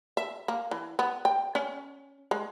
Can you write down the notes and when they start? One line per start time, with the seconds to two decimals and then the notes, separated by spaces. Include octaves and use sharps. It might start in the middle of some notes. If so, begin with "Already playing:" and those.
0.17 E5
0.48 A#3
0.71 E3
0.99 B3
1.25 G5
1.55 C#4
2.31 G#3